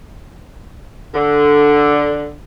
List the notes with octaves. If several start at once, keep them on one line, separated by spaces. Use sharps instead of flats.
D3